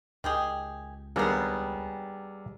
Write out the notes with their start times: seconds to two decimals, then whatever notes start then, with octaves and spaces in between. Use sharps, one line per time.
0.24 C#2 D#3 G4 G#4
1.16 D#2 G3 B3 D4 G#4 A#4